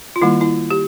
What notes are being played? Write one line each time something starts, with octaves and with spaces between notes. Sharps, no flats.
F4
D#3 G3 A#3 E4
E4
G4